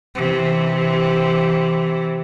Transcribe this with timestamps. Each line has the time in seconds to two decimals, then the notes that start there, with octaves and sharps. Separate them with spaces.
0.15 C3 E3